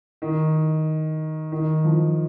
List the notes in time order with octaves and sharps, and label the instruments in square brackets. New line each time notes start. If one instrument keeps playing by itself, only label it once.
[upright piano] D#3
D#3
F3